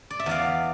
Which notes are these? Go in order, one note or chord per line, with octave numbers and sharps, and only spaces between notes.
D5
E5
E2 D5 F5